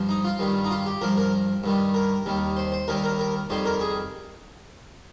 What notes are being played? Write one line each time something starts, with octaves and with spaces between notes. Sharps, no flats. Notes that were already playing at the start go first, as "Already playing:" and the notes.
Already playing: G2 F3
D#4
F4
G2 D#3 G3
D#4
F4
G4
G2 F3 A#4
A#4
G2 D#3 G3
A#4
D#2 D#3 G3
C5
C5
D#2 D#3 G3 A#4
A#4
A#4
F2 D#3 G3 C5
A#4
G#4